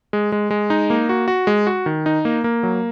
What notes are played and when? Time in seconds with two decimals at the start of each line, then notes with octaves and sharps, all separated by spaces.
0.13 G#3
0.32 G#3
0.51 G#3
0.70 D#4
0.90 A#3
1.09 F#4
1.28 F#4
1.47 G#3
1.67 F#4
1.86 D#3
2.06 D#4
2.25 A#3
2.44 A#3
2.63 F#3